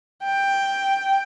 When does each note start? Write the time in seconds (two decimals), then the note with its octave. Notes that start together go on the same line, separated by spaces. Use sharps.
0.24 G5